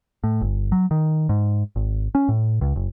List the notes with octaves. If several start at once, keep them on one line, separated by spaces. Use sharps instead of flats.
A2
G1
F#3
D#3
G#2
G#1
C#4
A2
C#2
F#1